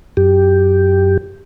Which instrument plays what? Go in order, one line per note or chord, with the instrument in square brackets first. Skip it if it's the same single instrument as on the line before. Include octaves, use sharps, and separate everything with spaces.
[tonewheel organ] F#2 G4